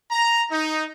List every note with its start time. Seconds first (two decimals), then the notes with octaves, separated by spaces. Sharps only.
0.11 A#5
0.52 D#4